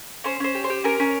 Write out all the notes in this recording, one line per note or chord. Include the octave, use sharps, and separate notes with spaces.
C#4 C5
C#4 C5
G4
C5
G4
C#4 A#4
C#4